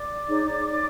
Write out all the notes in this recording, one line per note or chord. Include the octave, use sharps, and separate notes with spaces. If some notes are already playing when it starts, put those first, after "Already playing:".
Already playing: D5 D6
D#4 G#4 C#5